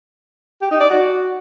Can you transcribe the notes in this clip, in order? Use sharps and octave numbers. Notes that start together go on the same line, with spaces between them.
G4
D#4
D5
F#4